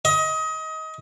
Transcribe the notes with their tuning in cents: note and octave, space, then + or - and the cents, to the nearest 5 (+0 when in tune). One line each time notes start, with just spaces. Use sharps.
D#5 +25